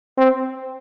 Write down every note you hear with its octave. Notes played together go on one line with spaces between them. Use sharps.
C4